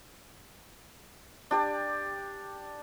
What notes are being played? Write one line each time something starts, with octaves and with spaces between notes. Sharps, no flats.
D4 G4 D5